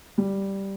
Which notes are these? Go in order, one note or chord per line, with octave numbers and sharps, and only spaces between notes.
G3